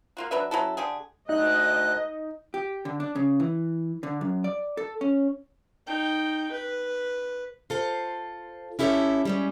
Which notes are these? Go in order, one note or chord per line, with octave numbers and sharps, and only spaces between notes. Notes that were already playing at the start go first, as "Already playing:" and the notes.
A#3 F4 F#4
F#3 D4 B4 E5
F#3 C#4 E4 A4
D3 G4 G#4
D2 D#4 D#5 F#6
G4
D3
D4
C#3
E3
D3
F#2
D5
A4
C#4
D#4 G5
B4
F4 A4 C5
C#4 E4 G4 A4 C#5
G3 G#3 C#4